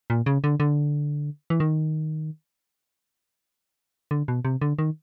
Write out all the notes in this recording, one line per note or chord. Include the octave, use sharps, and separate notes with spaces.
A#2
C#3
D3
D3
E3
D#3
D3
B2
C3
D3
D#3